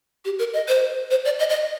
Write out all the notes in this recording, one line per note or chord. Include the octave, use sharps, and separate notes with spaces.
G4
A#4
D#5
C5
C5
D5
D#5
D#5